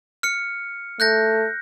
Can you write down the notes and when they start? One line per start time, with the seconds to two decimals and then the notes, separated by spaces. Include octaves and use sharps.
0.23 F6 C#7
1.00 A3 F#6 G6 A#6